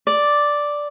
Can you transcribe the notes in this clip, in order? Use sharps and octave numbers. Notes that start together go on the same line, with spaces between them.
D5